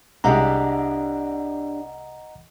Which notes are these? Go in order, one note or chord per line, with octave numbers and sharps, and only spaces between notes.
C2 G#3 D4 G4 D5 D#5 F#5 A#5